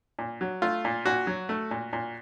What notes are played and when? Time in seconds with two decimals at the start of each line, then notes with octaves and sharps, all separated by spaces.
0.19 A#2
0.41 F#3
0.62 A3 F4
0.85 A#2
1.06 A#2 F#4
1.27 F#3
1.49 A3
1.71 A#2
1.93 A#2